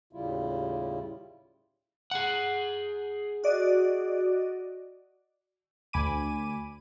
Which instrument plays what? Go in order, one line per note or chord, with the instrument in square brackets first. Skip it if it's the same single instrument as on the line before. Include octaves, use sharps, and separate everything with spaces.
[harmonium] D#2 A2 C#3 G3 E4 F4
[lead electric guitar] G#4 F#5
[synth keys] F#4 D5 D#5
D2 G#5 B5 D6 D#7